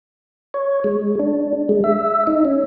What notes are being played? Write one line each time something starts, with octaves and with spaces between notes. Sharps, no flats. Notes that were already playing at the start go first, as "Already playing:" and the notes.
C#5
G#3
D4
G#3
E5
D#4
C#4